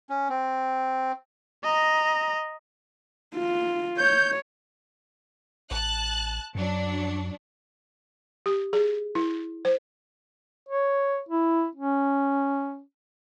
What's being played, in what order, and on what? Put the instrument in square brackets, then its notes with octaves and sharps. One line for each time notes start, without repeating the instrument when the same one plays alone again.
[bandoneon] C#4
C4
[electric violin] D#5 A#5
[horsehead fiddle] F4
[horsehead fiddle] C#5 [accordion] G6
[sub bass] A1 [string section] A5 F#6
[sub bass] F#2 [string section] F#3 D4
[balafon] G4
G#4
E4
C5
[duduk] C#5
E4
C#4